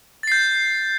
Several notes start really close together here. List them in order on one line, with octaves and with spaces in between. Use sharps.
A6 C7 G6